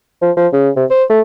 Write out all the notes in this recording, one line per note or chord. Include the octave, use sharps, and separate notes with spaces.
F3
F3
C#3
C3
C5
A3